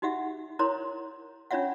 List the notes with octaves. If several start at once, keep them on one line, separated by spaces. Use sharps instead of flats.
D#4 F#4 G4 E5 F#5
E4 A#4 C#5 A#5 C6
C#4 D4 F4 C#5 E5 F#5